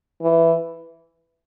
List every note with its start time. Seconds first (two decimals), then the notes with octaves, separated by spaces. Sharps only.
0.22 E3